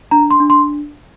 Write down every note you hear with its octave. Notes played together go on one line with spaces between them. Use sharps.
D4 A#5
C6
D4
C6